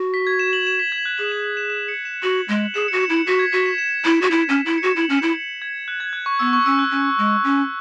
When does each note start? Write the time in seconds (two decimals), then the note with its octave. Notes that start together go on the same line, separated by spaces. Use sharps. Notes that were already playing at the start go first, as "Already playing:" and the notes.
Already playing: F#4
0.14 B6
0.27 G#6
0.39 E7
0.53 F#7
0.67 E7
0.79 B6
0.92 G#6
1.05 F#6
1.18 G#4 F#7
1.32 E7
1.44 F#7
1.57 E7
1.70 E7
1.88 C#7
2.05 E7
2.23 F#4 F#7
2.48 G#3
2.74 G#4 E7
2.88 F#4 C#7
3.00 E7
3.09 E4 C#7
3.27 F#4 B6
3.39 G#6
3.52 F#4 B6
3.66 E7
3.78 E7
4.04 E4
4.22 F#4
4.31 E4
4.49 C#4
4.66 E4
4.78 C#7
4.83 F#4 E7
4.96 E4
5.01 F#7
5.09 C#4
5.18 E4 E7
5.35 C#7
5.62 G#6
5.88 F#6
6.00 G#6
6.13 F#6
6.26 C#6
6.39 B3 E6
6.53 C#6
6.65 C#4 E6
6.79 F#6
6.91 C#4
7.18 G#3
7.44 C#4